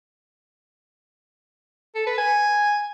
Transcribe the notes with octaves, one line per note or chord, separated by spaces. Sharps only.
A4
B4
G#5